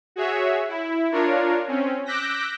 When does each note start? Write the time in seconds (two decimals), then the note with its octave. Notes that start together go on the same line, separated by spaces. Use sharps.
0.16 F#4 G#4 C#5 E5
0.68 E4
1.12 D4 F4 A#4 C#5
1.68 C4 C#4
2.05 D6 E6 F#6 G6 A#6 B6